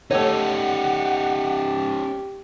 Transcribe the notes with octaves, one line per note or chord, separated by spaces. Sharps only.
A3 C#4 D#4 G4 C#5 F#5